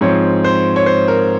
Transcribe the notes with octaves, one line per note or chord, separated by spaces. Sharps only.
G#2 F3 C4 C#5
C5
C#5
C5
A#4